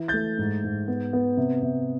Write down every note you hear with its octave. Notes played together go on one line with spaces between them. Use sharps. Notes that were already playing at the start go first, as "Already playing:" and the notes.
Already playing: E3
A3 G6 A6
G#2
G#2
B3
B3
C3
C3